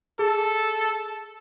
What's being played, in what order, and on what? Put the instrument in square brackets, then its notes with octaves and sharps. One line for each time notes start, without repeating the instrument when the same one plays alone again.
[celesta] G#4 [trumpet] A4